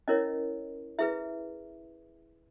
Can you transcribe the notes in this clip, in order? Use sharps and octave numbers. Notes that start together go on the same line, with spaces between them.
C#4 E4 A#4 C#5 D#5
E4 G#4 B4 E5